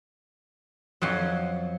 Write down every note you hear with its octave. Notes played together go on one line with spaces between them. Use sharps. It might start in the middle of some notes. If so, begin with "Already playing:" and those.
F2 F#3